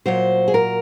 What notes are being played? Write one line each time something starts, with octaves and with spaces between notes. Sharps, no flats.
A#2 F#3 C5
G#4
A#4